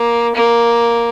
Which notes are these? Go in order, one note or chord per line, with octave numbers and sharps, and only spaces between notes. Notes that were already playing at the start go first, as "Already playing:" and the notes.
Already playing: A#3
A#3